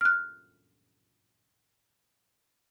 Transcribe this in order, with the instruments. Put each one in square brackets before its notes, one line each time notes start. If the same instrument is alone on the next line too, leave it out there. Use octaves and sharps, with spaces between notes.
[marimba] F6 F#6